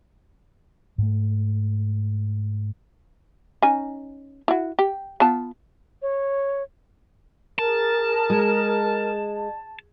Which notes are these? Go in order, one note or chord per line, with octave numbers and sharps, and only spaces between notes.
G#2 A3
C#4 D#4 G#5
E4 F#4
G4
B3 F4 A5
C#5
G#4 A#4 A5
G#3